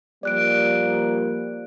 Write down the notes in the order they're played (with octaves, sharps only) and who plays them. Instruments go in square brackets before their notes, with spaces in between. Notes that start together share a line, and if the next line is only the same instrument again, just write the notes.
[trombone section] F3 G3 A#3 [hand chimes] D5 F#6 D7